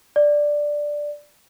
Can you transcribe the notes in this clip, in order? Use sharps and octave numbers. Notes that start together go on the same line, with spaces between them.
D5